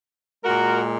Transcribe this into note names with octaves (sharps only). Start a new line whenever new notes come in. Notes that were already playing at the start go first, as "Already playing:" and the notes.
A#2 G#3 F#4 A#4